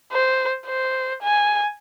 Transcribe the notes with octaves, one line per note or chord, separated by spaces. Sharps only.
C5
C5
G#5